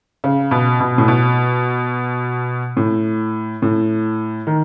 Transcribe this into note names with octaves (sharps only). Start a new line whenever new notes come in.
C#3
B2
B2
A2
B2
A2
A2
D#3